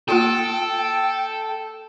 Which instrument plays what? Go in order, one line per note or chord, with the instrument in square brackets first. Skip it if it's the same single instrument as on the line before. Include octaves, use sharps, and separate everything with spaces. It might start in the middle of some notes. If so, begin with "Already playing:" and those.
[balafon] A#3 F4 F#4 [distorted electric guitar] A4 [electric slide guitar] G5